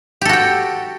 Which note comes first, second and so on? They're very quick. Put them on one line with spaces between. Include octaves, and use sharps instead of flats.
G4 A4 F#4 G5